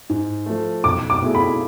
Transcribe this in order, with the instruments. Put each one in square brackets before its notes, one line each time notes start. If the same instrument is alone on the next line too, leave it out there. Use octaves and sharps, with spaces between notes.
[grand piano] G#2
F3 A3
[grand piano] B1 [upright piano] D6
[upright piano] D6
[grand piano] B2 A3 E4 G#4
[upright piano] B5